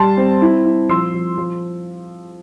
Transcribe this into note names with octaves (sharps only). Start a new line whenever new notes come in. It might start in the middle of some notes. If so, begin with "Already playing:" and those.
Already playing: G3 A5 C6
C4
E4
E4
F3 C6 E6
F3
F3